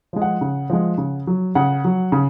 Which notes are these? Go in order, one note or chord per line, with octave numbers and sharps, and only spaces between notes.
F3 G#3
F#5
C#3
F3 G#3
C#3
F#3
C#3 F#5
F#3
C#3